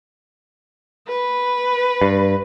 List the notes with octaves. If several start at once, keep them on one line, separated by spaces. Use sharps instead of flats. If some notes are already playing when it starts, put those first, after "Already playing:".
B4
G2